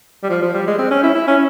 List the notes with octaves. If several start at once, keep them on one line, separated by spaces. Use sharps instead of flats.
G3
F3
F3
G3
G#3
C4
C#4
E4
E4
C#4